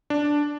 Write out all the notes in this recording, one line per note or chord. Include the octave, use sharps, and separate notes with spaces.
D4